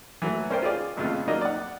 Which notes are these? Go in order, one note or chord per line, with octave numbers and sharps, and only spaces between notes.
E3 F#3 A3
C#4 A#4 C5 D5 G5
F4 G#4 D5
G#1 F2 C#3 A3 F4
F#3 A#3 D#4 D5 D#5
D5 F#5